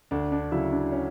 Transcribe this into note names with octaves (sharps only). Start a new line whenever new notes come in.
D2 D4
D4
C#3 F#3 E4
D4
C#4